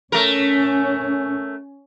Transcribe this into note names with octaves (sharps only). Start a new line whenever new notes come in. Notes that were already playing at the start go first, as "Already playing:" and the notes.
A3 C#4 A#4